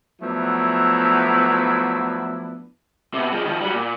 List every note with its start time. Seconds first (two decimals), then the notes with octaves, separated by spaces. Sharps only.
0.22 F3 F#3 A3 B3 D4 E4
3.14 C3 B3
3.32 F3 G#3
3.45 D#3 F3
3.61 F#3 G3
3.73 A#2